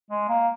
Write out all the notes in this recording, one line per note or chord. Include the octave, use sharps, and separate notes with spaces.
G#3
A#3